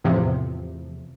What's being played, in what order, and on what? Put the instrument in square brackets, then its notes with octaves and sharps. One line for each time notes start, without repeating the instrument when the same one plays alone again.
[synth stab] E2 A2 C3 F3